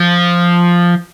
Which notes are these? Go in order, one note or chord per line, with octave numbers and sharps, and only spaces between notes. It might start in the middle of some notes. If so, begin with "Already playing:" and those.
Already playing: F3